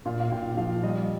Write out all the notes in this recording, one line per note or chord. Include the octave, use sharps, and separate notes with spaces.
A#2 F5
F5
A#2 G5
F3 F5
G3 D#5